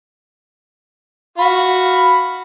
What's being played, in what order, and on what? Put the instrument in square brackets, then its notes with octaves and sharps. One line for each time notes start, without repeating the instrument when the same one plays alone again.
[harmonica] F#4 F5 [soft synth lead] B5